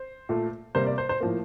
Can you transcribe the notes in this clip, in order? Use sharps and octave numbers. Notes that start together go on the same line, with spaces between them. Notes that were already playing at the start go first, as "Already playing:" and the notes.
Already playing: C5
A#2 A3
C3 G3 A#3 C5
D5
C5
C5
A2 F3 A#3